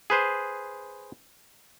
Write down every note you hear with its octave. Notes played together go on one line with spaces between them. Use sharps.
G#4 B4 C5